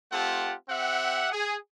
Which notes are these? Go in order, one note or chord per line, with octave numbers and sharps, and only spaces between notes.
A3 C4 F4 G4 F#5 A5
C4 G4 E5 F#5
G#4